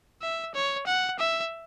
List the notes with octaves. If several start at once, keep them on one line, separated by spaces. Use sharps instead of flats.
E5
C#5
F#5
E5